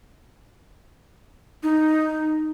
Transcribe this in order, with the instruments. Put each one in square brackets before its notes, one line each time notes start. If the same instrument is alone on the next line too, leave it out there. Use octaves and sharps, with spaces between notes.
[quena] D#4